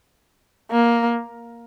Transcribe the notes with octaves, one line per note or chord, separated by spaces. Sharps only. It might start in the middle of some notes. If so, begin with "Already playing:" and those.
A#3